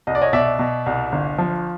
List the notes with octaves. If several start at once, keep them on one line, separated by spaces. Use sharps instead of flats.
C2 D#5
D5
C#5 D#5
B2 D5 E5
B2
C2
G1
F3